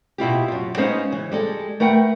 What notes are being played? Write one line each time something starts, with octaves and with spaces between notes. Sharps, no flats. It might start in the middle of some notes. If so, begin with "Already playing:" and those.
B2 E4 F4 G4
F#2 F4
G#3 B3 C#4 D#4 C5 F5
C#3 E3
G3 G#3 A4
A3 A#4 B4 F#5 G5